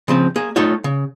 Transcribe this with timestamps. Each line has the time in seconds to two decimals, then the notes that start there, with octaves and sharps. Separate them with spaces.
0.08 C#3 F3 C4
0.36 A#3 G#4
0.56 A3 D#4 F4 A4 C#5
0.84 C#3